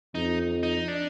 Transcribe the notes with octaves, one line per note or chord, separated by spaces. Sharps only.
F2 D#4
D#4
D4